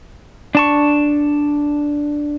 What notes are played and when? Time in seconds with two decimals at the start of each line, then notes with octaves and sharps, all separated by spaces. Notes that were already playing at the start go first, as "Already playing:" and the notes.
0.55 D4 A5 C#6